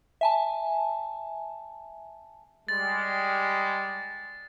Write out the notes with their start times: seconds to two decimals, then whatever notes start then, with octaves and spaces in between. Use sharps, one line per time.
0.21 E5 G#5 A5
2.68 G3 G#3 A6